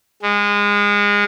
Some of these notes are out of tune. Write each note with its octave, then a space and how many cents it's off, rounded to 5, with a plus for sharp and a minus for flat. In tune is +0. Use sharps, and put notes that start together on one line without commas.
G#3 -25